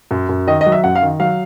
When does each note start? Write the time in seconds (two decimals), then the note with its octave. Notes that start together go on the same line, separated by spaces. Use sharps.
0.11 F#2
0.29 F#2
0.47 D#3 D#5
0.61 D#5
0.66 F#3
0.72 E5
0.84 F#2 F#5
0.95 F5
1.02 D#3
1.20 F#3 F5